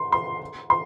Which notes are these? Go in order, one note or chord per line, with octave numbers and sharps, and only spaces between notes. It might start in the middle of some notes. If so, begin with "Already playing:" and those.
Already playing: C6
C6
C6